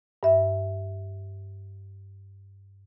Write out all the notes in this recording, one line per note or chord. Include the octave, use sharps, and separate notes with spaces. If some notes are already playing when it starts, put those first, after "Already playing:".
G2 E5